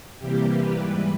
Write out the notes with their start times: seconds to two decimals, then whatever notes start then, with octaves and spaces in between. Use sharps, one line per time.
0.20 C3 E3 G3 A#3 G4
0.50 B4
0.79 G#2 E3 G3